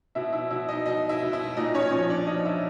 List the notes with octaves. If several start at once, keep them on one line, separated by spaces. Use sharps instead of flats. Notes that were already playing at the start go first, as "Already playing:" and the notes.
B2 E4 E5
E4 E5
B2 E4 E5
D#4 D#5
B2 D#4 D#5
E4 E5
B2
E4 E5
A#2 D#4 D#5
C#4 C#5
F3 C#4 C#5
D4 D5
F3 D#4 D#5
E4 E5